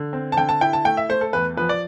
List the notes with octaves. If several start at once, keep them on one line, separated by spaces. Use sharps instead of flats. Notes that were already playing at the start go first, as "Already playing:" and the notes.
Already playing: D3
C4
A5
D3 G5
A5
E4 G5
A5
A3 G5
E5
A3 C5
A4
E2 B4
F3 B4
D5